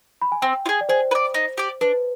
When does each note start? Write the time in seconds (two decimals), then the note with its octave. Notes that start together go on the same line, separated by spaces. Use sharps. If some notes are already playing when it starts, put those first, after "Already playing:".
0.22 B5
0.32 G#5
0.42 C4 G5
0.66 F4
0.69 G#4
0.81 D5
0.89 G#4 C5
1.11 B4
1.15 D5
1.34 D#4
1.57 G4 D5
1.81 D4 B4